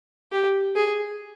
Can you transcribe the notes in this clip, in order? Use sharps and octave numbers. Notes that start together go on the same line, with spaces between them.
G4
G#4